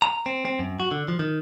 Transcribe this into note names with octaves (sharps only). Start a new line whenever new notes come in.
A#5
C4
C4
F#2
F#4
D3
F3
D#3